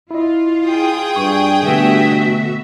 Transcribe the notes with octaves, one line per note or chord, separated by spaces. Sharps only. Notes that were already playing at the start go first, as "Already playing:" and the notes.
E4 F4 D#5
G#4 G5 D#6
G2 C#6
G2 B2 D3 A3 F#4 E5